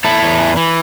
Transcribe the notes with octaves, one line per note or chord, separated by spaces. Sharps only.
E2 E4 A4
E2
E3
E3